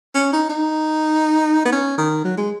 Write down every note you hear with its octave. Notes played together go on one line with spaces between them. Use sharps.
C#4
D#4
D#4
B3
C#4
D#3
F#3
G#3